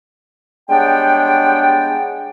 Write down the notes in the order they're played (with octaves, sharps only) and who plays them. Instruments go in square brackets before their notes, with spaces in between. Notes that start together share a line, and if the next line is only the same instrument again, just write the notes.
[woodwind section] G3 G#3 B3 D4 C#5 G5